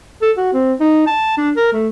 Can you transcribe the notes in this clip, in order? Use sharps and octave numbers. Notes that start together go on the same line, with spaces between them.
A4
F#4
C4
D#4
A5
D4
A#4
A3